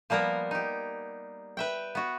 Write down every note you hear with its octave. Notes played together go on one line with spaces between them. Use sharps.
F3 G3 A#3 B3 A#4
D#4 G4
B4 E5 G5
B3 F#4